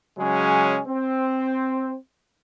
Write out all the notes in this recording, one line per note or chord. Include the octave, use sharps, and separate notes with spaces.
C#3 F#3 G#3 C#4
C4